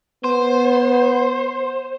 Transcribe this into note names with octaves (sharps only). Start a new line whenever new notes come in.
B3 C5